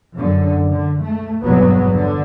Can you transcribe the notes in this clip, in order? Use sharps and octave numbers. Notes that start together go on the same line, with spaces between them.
F#2 D3
D3
A3
G#1 E2 G2 B2 F#3 B3
D3